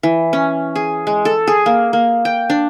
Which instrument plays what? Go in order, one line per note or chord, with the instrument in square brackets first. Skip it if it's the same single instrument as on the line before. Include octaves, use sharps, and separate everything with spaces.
[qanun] E3
C#4
G#4
G#3
A4
G#4
A#3
A#3
G5
D4